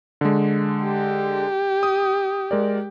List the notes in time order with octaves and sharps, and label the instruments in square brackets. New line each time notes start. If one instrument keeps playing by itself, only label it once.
[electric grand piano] D3 G#3
[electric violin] G4
[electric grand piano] D#6
G#3 A#4 D5